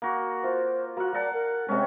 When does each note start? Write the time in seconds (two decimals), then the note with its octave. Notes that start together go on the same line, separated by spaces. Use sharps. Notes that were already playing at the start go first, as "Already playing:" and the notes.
0.02 A#3 F#4
0.44 F4 C5
0.97 A#3 F#4 F#5
1.14 D5 F#5 A5 A#5
1.33 A#4
1.68 C3 G#3 C4 C#4